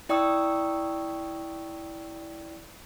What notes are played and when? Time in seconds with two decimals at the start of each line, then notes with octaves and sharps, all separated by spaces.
0.09 E4 D5 G5 C#6 D#6 E6